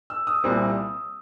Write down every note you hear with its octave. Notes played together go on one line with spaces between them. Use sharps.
E6
D#6
C2 A#2 G3 C4